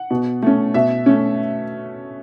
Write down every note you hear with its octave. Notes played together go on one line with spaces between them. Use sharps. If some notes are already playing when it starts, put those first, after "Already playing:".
Already playing: F#5
B2
A3 C#4
B2 E5
A3 C#4